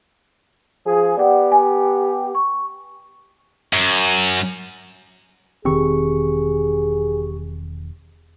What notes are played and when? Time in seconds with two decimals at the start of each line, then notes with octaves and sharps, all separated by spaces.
0.87 F3 G#4
1.17 B3 G4 D5 F#5
1.52 G#5
2.35 C#6
3.73 F#2
5.65 E1 D#3 C4 G4 G#4 C#6